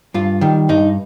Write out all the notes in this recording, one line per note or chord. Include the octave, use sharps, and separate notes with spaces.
G2 F4
D#3 G3
G2 D#4